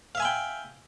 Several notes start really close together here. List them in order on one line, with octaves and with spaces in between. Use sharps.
F5 E5 G#5 B5 G5